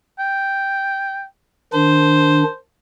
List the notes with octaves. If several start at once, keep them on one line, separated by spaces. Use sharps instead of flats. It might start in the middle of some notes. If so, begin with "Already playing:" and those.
G5
D#3 D4 C5